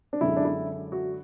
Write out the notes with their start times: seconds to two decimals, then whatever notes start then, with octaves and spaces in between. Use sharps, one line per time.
0.13 D4
0.21 F#2 D3 G#3 E4
0.37 D4
0.45 E4
0.92 F#4